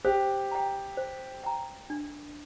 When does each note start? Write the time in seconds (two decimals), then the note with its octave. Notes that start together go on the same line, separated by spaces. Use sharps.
0.05 G4 C5
0.51 G5 A#5
0.97 C5
1.44 G5 A#5
1.90 D4